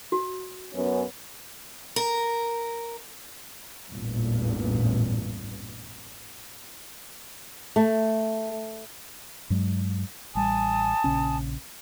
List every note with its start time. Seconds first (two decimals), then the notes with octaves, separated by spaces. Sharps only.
0.12 F#4
0.74 F#2 B3 C#4
1.96 A#4
3.89 A1 E2 G2 A#2
7.76 A3
9.50 G2 F#3 G#3
10.35 A1 G3 G#5 A5 D#6
11.04 A#1 C#3 C#4